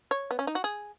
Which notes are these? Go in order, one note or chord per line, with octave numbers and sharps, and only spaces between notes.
C#5
B3
C#4
D#4
F#4
G#4